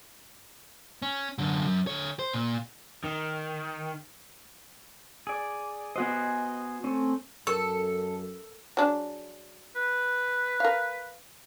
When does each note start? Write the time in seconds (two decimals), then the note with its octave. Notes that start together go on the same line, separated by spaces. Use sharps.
1.02 C#4
1.38 F#2 D3
1.66 F#2
1.87 D3 C#5
2.19 C5
2.33 A#2
3.05 D#3
5.27 G#4 D5
5.96 B3 F#4 C5 D#5 F#5 G#5
6.84 A3 C4 C#4
7.47 F#2 A4 A#4 C#6 E6
8.77 F#3 D4 G#4
9.76 B4
10.60 A#4 F5